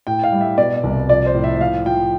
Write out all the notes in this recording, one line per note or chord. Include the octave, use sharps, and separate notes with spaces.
A2 G5
F5
G3
E5
B2 D5
C2
F3 D5
C5
A2
E5
E5
F3 F5
F3 G5